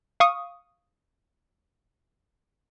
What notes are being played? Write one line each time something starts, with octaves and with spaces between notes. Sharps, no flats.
F5 C#6 D#6